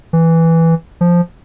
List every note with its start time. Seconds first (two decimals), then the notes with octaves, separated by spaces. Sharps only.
0.13 E3
1.01 F3